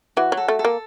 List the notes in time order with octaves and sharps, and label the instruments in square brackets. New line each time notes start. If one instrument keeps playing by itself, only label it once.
[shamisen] E3 [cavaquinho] F#4
[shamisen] F#3
[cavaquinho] A4
[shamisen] A3
[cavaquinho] A4
[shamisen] A#3